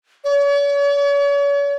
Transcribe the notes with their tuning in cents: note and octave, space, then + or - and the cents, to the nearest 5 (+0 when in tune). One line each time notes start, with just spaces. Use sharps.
C#5 +40